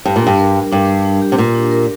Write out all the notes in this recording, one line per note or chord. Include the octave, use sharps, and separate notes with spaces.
G2 G4
A#2
G2 D4
A#4
G3
G2 D4
G3
D4
G4
C3
A#2 G4
D4
A#4